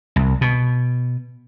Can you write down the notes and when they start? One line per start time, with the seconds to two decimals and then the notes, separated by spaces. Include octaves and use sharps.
0.16 C2
0.41 B2